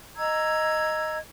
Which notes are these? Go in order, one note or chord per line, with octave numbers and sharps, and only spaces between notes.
D#5 A#5 E6 G#6